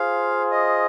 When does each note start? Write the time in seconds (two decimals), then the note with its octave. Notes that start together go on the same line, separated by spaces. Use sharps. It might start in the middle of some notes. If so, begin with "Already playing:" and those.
Already playing: F4 G#4 C5 F5
0.51 D#5